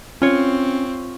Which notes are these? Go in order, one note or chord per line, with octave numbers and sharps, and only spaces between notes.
C4 C#4 F4 C#5